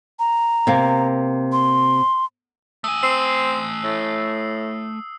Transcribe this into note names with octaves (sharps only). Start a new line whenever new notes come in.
A#5
C3 A#3
C6
A3 G#5 D#6 E6
C4 C7
A2